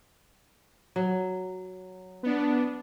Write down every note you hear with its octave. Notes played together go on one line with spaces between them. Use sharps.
F#3
B3 D4